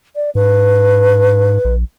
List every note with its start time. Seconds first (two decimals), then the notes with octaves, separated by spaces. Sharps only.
0.16 D5
0.35 G#2 B4
1.65 A#1